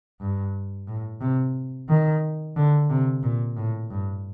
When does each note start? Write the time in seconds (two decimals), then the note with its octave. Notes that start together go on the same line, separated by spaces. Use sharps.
0.20 G2
0.88 A2
1.21 C3
1.89 D#3
2.56 D3
2.89 C3
3.23 A#2
3.56 A2
3.90 G2